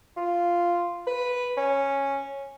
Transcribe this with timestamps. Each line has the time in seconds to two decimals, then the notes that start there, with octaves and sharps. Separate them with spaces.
0.16 F4
1.07 B4
1.57 C#4